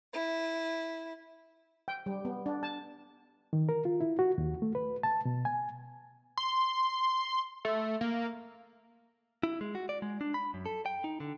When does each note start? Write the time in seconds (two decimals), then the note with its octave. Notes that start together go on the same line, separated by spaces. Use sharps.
0.14 E4
1.88 G5
2.06 G3
2.25 B3
2.46 D4
2.63 A5
3.53 D#3
3.69 A#4
3.85 F4
4.00 E4
4.19 F#4
4.38 D#2
4.62 A3
4.75 B4
5.03 A5
5.25 B2
5.45 G#5
6.37 C6
7.65 A3
8.01 A#3
9.43 E4
9.61 G#3
9.75 F#4
9.89 D5
10.02 G#3
10.21 D4
10.34 B5
10.54 F#2
10.66 A4
10.86 G5
11.04 D#4
11.20 D3